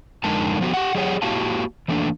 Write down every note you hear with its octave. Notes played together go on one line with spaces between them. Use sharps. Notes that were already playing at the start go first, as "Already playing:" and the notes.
F2 D3 G#3 D#4 A#4 A5
F3 B3 F#4 G4
G4 F#5
F#3 G4 G#4 C#5 F#5
A#3 E4 F#4 G4 F5 A5
E3 A3 A#3 D4